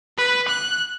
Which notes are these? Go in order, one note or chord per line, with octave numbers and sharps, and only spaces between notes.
B4
F#6